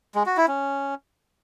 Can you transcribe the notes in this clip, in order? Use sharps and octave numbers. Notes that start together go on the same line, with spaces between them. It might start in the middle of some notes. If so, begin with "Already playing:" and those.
G#3
F#4
E4
C#4